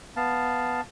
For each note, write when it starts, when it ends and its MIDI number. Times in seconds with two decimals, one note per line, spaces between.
0.16 0.81 59
0.16 0.81 77
0.16 0.81 81